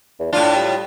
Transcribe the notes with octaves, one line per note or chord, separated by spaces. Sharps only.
E2
A2 D4 F4
G3